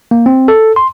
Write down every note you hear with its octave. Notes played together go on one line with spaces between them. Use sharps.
A#3
C4
A4
C6